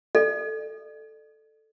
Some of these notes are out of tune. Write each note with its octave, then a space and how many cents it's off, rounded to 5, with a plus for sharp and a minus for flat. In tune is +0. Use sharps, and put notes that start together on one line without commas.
A4 +0 D5 +35